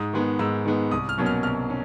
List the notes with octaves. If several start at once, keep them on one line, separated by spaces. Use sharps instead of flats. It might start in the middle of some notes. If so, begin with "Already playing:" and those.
Already playing: G#2 D#6
D#3 G#3 B3
G#2 E6
D#3 G#3 B3
C2 D#6
F6
B2 F#3 A#3 C#4
F6
C2 F6
C#4